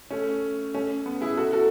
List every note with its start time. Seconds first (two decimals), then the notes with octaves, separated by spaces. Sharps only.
0.10 A3 C#4
0.74 A3 C#4
1.06 B3
1.21 E4 G#4
1.37 F#4 A4
1.52 F#4 A4